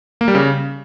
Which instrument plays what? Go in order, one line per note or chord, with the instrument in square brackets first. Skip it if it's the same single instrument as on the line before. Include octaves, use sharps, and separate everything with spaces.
[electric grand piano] A#3
G3
C#3